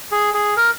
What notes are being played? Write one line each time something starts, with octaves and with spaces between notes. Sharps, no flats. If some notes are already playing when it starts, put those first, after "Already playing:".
G#4
G#4
A#4